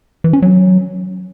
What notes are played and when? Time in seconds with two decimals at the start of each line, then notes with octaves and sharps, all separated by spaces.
0.24 E3
0.33 C#4
0.42 F#3